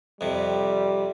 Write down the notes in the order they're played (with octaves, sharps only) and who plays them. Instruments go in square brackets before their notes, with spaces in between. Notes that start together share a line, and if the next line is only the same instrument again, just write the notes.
[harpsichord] F2 C3 [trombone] G3